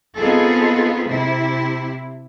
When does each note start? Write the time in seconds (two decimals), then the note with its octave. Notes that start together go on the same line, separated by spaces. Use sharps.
0.16 B3 C4 D#4 F4 G#4 A4
1.08 C3 E4